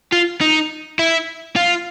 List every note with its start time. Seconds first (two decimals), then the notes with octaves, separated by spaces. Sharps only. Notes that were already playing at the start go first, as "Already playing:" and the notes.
0.12 F4
0.41 D#4
0.99 E4
1.56 F4